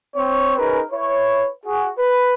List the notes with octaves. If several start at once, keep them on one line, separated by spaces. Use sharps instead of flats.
C4 C#5
C#4 D#4 G#4 A#4 B4
E4 B4 C#5
F#4 G#4
B4